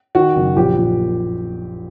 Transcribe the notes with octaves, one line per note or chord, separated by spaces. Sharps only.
D#3 F#4
F#1
A#1 G4
A#2